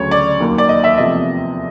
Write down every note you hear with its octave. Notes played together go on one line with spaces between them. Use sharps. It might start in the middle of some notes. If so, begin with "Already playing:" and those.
Already playing: D2 C#3 F#3 C#5
D5
D#2 D#3 F#3 A#3
D5
D#5
E5
E2 C3 F3 A3 D#5